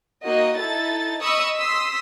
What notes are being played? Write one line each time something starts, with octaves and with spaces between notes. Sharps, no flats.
A#3 D#4 F#4 D#5
D#4 E4 A4 A6
D#5 B5 C#6 D#6 E6
C6 D#6 E6 B6